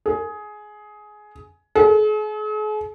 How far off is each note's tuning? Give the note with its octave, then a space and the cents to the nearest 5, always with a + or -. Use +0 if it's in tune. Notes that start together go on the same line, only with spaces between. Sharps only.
G#4 +15
G#4 +45